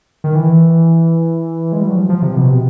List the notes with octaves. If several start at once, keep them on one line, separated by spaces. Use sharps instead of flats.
D#3
E3
G#3
G3
F#3
F3
F3
C3
B2
C3